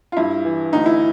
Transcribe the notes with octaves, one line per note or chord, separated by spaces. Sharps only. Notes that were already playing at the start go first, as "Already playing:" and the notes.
F4
G2 E4
E3
D2 D#4
E4